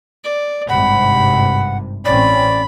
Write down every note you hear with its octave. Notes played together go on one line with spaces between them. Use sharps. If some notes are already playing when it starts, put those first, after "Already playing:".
D5
G#1 G2 C3 F#5 B5
A1 C4 C#4 D5 B5